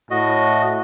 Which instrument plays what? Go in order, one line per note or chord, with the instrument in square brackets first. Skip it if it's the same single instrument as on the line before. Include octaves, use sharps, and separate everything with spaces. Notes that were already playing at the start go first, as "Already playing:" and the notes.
[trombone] A2 [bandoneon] F#4 D#5